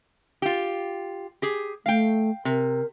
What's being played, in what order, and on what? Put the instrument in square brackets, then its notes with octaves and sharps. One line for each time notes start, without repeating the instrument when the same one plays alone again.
[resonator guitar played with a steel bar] F4 G4
G4 G#4
[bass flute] A3 [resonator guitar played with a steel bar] F5 G5
[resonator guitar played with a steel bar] C3 [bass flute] A#4